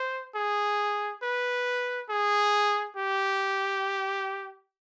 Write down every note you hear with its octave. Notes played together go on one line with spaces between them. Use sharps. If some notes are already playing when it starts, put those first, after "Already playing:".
Already playing: C5
G#4
B4
G#4
G4